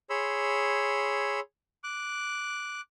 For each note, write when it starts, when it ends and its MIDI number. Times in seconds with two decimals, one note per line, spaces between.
0.10 1.40 68
0.10 1.40 73
0.10 1.40 83
0.10 1.40 84
0.10 1.40 88
1.84 2.81 86
1.84 2.81 90